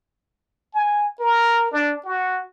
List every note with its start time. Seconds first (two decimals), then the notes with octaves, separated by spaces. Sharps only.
0.73 G#5
1.20 A#4
1.72 D4
2.05 F#4